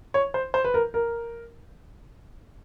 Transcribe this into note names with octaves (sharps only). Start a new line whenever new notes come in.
C#5
C5
C5
B4
A#4
A#4